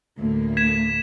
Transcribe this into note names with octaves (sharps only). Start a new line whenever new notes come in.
D2 A2 A#3
G#6 B6 E7